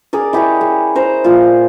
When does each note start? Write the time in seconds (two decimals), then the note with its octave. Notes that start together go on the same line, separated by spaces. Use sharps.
0.13 G#4 A#4 D5
0.33 E4 G4 G#4 C#5
0.61 G#4
0.95 A#4 C5 A#5
1.24 A#2 F4